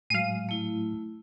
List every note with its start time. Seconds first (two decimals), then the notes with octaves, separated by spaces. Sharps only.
0.10 A2 F#3 G#3 F5 D#7
0.49 A3 E4